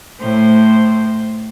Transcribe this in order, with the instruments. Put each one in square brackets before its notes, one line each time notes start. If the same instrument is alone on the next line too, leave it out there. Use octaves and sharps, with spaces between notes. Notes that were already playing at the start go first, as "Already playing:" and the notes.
[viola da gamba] A2 C5